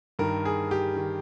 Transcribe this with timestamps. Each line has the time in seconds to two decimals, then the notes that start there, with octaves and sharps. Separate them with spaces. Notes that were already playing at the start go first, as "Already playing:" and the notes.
0.19 G2 D#3 A#4
0.45 G#4
0.71 G4
0.96 D#3